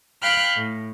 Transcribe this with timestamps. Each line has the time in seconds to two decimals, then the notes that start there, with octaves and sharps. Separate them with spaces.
0.21 F5 G5 B5 F6 F#6
0.56 A2